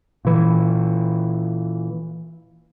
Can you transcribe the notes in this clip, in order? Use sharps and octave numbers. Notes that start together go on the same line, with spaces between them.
A#2 E3